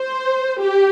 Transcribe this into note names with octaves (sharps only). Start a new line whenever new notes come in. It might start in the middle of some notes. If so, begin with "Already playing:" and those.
Already playing: C5
G4